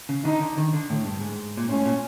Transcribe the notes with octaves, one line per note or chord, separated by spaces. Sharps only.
C#3
D3 D#4
D3
D#3
D3
A2
G2
G#2
A#2
A2 C#4
A#2